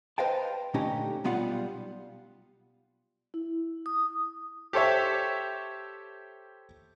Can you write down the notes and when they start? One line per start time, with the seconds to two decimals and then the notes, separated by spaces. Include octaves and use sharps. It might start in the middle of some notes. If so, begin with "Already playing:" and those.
0.18 B4 C5 D#5 F5 G5 A5
0.74 A#2 D3 A3 C#4 D#4 G4
1.24 B1 G3 B3 F4 F5 F#5
3.34 E4
3.86 D#6
4.73 G4 A4 C5 C#5 E5